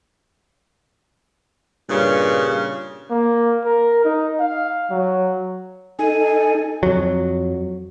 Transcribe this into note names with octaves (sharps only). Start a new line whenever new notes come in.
G2 A#2 C#3
A#3
A#4
D#4
F5
F#3
D#4 A4 G#5
F2 F#3